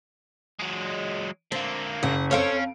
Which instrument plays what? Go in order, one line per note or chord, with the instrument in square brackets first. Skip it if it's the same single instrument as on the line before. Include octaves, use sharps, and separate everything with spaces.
[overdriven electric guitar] F#3 G#3
[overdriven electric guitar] D3 A#3 [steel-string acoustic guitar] C4
[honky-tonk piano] F#1 [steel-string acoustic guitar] F#5
[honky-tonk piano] F2 F5 D7 [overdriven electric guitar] C#4 [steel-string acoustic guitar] A4 C5 C#5